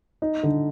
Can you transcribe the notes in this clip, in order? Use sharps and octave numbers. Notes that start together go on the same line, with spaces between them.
D#4
D3